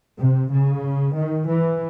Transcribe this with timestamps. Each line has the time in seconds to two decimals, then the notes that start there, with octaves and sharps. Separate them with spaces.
0.19 C3
0.52 C#3
1.17 D#3
1.50 E3